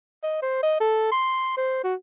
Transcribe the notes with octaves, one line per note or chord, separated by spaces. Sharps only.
D#5
C5
D#5
A4
C6
C5
F#4